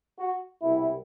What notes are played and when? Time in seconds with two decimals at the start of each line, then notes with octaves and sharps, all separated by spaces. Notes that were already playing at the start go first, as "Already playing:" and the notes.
0.19 F#4
0.61 C2 B2 G3 E4